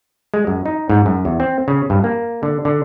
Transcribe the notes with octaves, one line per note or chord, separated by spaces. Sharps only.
G#3
F#2
D#4
G#2
F#2
E2
C4
C#3
G2
A#3
D3
D3